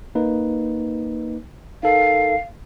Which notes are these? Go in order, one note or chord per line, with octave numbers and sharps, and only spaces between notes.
A#3 D#4 B4
D#4 A4 A#4 F5